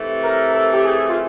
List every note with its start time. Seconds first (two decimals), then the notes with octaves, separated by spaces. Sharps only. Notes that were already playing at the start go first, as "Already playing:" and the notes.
Already playing: C3 E3 A3
0.23 A#4
0.54 A4
0.73 G4
0.85 G#4
1.10 F4